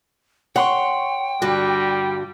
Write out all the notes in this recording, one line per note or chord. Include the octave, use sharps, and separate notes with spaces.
C#5 F#5 G5 C6 C#6
G2 D3 G3 F#4